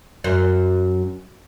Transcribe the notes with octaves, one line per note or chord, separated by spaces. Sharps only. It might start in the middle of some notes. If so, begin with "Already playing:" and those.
F#2